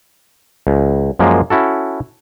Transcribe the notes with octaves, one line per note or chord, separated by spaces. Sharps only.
C#2
F#2 F3 G#3 A#3
C#4 E4 F#4 A4